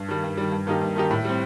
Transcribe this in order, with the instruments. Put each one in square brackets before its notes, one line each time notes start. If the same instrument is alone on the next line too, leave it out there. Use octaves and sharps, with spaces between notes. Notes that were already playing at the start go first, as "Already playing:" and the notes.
Already playing: [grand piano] G2
D#3 G3
G2
D#3 G3
G2
D#3 A#3 D#4 G4
G2
D#3 A#3 D#4 G4
A2
G3 C4